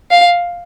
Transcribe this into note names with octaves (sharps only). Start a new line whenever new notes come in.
F5